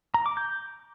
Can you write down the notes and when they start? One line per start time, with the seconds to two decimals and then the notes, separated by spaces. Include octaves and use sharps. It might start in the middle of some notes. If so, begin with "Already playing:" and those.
0.14 A#5
0.26 D6
0.37 G6